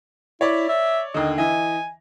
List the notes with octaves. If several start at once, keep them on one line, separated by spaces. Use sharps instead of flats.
E4 C#5 D5
E5
D#2 D3 D#5
E3 D#5 E5 G#5